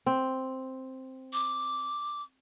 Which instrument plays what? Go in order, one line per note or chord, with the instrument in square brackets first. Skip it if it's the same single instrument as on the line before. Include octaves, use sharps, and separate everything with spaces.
[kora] C4
[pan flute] D6